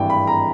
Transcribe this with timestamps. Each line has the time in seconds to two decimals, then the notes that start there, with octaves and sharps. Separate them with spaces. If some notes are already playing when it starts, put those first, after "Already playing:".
Already playing: G#1 G2 E3 G5
0.10 B5
0.27 A#5